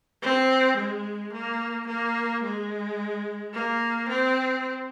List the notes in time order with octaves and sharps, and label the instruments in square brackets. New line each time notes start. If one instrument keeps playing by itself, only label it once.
[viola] C4
G#3
A#3
A#3
G#3
A#3
C4